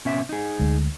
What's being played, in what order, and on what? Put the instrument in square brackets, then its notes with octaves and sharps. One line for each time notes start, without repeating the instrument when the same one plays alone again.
[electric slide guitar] B2 C#4 E5
D#4 G#4
[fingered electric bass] D2 G#3